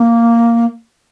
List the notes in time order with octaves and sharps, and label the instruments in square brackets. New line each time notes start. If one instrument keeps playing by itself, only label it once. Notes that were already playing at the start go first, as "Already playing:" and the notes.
Already playing: [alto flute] A#3